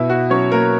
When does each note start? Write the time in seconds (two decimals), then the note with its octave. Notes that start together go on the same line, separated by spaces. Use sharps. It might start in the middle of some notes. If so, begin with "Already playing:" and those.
Already playing: B2 E4
0.10 F#4
0.30 F#3 C#4 C#5
0.52 A#3 A#4